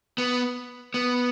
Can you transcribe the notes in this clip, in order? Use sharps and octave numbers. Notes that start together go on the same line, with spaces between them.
B3
B3